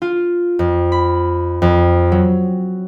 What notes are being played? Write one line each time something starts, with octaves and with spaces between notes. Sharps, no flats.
F4
F2
B5
F2
F#3